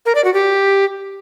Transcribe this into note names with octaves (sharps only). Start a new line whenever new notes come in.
A#4
D5
F#4
G4